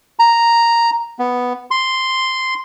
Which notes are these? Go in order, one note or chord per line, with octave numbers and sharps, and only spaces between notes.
A#5
B3
C6